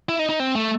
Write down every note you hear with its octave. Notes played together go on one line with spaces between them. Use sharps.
E4
D#4
D#4
C4
A3